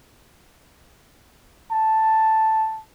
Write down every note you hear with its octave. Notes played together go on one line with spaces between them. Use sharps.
A5